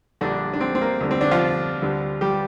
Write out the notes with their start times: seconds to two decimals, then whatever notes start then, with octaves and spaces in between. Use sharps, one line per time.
0.21 A#1 A#2 D3 G3 D4
0.54 D4
0.61 C4
0.75 C4
0.82 A#3
1.01 D2 D3 G3
1.11 C4
1.21 D3 D4
1.31 F3 F4
1.82 D2 D3 G3
2.21 G3 G4